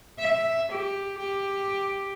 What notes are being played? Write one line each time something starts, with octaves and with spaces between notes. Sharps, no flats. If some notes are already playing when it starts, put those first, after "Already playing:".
E5
G4
G4